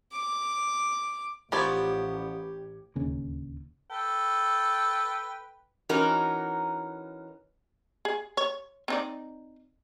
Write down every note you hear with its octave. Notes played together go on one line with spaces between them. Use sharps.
D6
A1 F3 B3 G4 D5 B5 C#6 G#6
D1 D#2 C#3 A#3
A4 B4 G5
E3 C#4 D#4 F#4 A#4
G#4
C#5
C4 D#4 D5